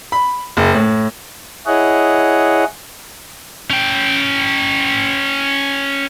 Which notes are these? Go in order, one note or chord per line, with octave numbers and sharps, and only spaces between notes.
B5
F#1
A2
E4 G#4 C#5 D#5 F#5
C#4 G5